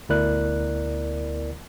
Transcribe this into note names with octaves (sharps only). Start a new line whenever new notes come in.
D2 B3 E4 A#4 D5 F#6